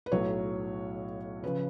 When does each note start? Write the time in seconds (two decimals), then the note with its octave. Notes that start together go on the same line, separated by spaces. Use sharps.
0.06 B4
0.12 B1 A2 F#3 C#5
1.43 C#3 F3 B4